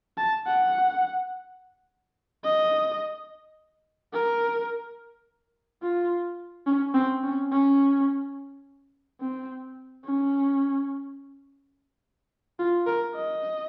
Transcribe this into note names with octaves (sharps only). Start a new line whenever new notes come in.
A5
F#5
D#5
A#4
F4
C#4
C4
C#4
C#4
C4
C#4
F4
A#4
D#5